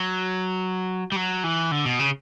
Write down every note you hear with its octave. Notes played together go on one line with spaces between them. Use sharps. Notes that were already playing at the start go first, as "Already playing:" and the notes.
Already playing: F#3
G3
F#3
E3
D3
B2
C#3